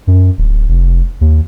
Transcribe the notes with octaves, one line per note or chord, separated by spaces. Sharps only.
F#2
D1
F1
D#2